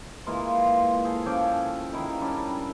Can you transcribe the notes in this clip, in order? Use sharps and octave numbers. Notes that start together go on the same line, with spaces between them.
E3 G#3 A#3 F4
G#4 A4 C5
F3 C#4 G5 D6
D#3 E4 G#4 A#4
G3 C#4 D4